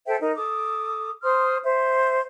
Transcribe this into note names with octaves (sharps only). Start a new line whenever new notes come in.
A4 C5 E5 G5
D#4 A#4
A4 D6 D#6
C5 C6 D#6 F6
C5 E5